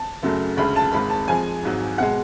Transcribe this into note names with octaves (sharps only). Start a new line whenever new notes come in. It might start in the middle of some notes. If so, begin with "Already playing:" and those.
Already playing: A5
F#2 C#3 F#3 A3
D2 C#3 G#3 B5
A5
G#1 G#2 G#3 B5
A5
F2 F3 G#3 G#5
G#1 G#2 F#3
B2 G#3 F#5